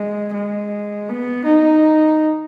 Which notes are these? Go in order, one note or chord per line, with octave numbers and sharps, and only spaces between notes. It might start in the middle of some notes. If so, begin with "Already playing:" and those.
Already playing: G#3
G#3
B3
D#4